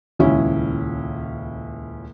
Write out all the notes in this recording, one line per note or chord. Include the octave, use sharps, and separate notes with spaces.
D#1 C#2 C#4 E4